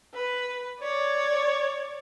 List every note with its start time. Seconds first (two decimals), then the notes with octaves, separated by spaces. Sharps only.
0.14 B4
0.80 C#5 D5